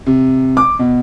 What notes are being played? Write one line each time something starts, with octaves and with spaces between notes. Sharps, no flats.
C3
D6
B2